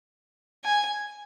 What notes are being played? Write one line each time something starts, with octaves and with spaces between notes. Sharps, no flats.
G#5